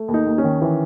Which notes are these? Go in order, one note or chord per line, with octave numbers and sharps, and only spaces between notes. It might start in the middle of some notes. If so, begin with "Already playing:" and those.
Already playing: A3
D#2
D#4
D#2
C#4
D#3
E3